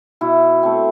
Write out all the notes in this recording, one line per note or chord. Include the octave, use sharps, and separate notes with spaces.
B2 E4
A3 C4